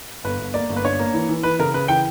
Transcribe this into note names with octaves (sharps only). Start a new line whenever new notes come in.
G1 B4
G1
A#3 D5
G1
B4
D4 C#5
A#3
E3
E3
E3 B4
C#3 A#4
C#3 B4
E3 G5